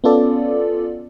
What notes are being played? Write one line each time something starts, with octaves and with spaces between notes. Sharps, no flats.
B3 C#4 F4 A4 D5